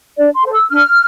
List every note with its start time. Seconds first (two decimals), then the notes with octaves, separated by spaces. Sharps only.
0.17 D4 D5
0.35 C6
0.44 A4 C5
0.52 E6
0.71 D4 F6